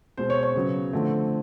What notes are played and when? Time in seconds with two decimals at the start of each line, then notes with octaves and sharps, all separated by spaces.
0.17 B2 G#3 C4 C5
0.30 C#5
0.43 C#5
0.55 C#3 F#3 B3
0.93 D3 F3 A3 C4